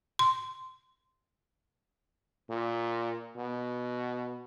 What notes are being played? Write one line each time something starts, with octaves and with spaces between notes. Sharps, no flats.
C6
A#2
B2